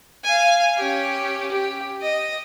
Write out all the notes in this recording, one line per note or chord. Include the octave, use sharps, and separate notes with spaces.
F5 G#5
C#4 G4
G4
D#5